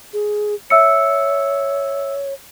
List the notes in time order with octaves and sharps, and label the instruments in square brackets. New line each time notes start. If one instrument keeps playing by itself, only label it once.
[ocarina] G#4
[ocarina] C#5 [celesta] E5 E6 C#7